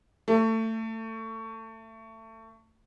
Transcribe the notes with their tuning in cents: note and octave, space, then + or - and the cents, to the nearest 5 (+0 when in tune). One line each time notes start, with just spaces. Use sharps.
A3 +25